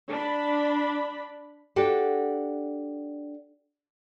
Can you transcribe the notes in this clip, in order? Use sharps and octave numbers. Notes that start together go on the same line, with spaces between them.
D4 B5
D4 F#4 G4 A4